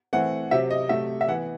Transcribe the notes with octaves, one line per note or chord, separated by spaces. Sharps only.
E3 A3 C4 F#5
C3 F#3 C4 E5
D#5
C3 F#3 A3 E5
E5
E3 B3 F#5